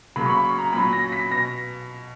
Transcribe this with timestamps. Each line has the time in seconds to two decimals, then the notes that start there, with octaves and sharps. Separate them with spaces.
0.16 C#3 F#3 A#3 B5
0.26 C#6
0.30 B5
0.44 C#6
0.58 A#5
0.73 A#2 F#3 C#4 B5
0.93 A#6
1.12 B6
1.31 B2 A#6